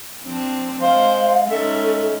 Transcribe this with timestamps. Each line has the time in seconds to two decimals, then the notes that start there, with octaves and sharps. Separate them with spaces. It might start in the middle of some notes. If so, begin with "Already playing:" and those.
0.23 F3 C4 D4
0.81 G#3 C5 F5
1.50 G#3 C#4 D#4 A4 E5